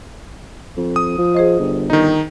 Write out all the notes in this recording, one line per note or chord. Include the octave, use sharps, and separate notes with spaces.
F2
D#6
F3
G#4 C5 D#5
G1
D#3 D#4